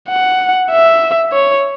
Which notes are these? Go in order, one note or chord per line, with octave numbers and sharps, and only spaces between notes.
F#5
E5
C#5